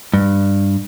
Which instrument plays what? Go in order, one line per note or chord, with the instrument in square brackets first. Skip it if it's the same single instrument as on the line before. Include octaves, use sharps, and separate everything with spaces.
[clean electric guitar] G2